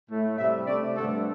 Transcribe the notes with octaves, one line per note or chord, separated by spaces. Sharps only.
A2 A3
C3 G3 E5
C3 A3 D5
G2 D3 A3 A4